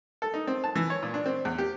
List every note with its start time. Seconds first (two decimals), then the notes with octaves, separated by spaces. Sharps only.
0.22 A4
0.34 D#4
0.47 C4
0.64 A5
0.75 E3
0.90 C#5
1.03 A#2
1.14 D4
1.26 C4
1.45 E2
1.58 G4